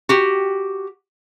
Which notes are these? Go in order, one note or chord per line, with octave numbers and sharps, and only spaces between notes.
F#4 G4